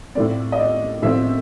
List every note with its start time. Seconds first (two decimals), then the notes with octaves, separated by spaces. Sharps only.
0.15 A2 F3 A3 C4 D5
0.52 D#5
0.60 D5
1.02 A2 F3 A3 C4 E5